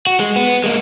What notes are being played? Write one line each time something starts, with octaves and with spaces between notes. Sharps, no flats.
F#4
G#3
B3
G#3 A#3